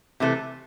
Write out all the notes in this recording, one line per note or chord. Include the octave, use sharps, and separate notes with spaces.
C3 E3 A3